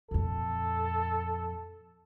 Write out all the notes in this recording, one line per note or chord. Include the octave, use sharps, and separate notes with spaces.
F2 A#2 A4